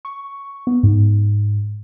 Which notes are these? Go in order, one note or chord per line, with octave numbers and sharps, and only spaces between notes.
C#6
B3
G#2